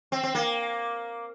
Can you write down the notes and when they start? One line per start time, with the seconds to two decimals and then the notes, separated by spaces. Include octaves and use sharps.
0.12 C4
0.23 C4
0.35 A#3